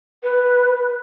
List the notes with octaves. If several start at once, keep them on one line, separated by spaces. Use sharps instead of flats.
B4